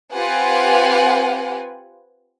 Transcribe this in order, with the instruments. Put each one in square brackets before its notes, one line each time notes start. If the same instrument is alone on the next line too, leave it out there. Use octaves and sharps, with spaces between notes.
[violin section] C4 F4 G4 B4 F#5 G#5